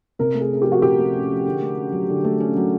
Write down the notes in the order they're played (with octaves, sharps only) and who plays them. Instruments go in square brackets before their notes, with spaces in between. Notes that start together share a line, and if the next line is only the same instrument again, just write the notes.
[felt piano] C3 [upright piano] A#4
[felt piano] A3
[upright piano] G#4
[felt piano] C#4 [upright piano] G#4
[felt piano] F3 [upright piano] G4
[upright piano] F#4
[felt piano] C3 [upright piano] G4
[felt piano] A3
C#4
F3
D3
A3
C#4
F#3
D3
A3
C#4
F#3